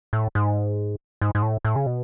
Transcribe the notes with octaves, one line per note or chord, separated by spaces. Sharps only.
A2
G#2
G#2
G#2
A2
A2
C#3
B2